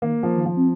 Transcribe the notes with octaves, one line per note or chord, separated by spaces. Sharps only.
D#3 A#3
F3
D#3
F3
C4